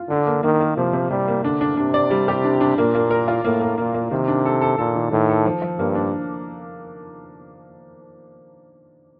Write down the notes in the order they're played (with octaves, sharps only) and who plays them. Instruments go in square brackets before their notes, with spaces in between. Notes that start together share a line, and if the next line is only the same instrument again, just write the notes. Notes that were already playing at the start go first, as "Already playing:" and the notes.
Already playing: [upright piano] F4
[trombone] D3 [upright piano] D4
[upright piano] A#3
[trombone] D#3 [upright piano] A#3
[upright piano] A#3
[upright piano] C3 [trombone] F3
[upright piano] C3
[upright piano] C3 [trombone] G3
[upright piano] A#3
[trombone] D3 [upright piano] D4
[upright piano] D4
[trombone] C3 [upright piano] D4
[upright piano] D5
G3
G4
D4
D4
[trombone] A#2 [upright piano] A#3
[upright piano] A#3
A#4
F4
[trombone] A2 [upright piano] A#3
[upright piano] A#3
[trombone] A#2 [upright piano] A#3
[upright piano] A#3
[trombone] C3 [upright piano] D#3
[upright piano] D4
A4
A4
[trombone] A#2 [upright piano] A4
[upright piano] D#3
[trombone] A2 [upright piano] D#3
[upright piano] A4
F3
F3
[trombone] G2 [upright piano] A#3
[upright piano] D4